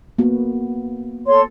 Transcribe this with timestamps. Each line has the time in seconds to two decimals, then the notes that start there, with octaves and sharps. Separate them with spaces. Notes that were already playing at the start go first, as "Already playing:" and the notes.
0.18 A#3 B3 F#4
1.27 A4 C#5 C6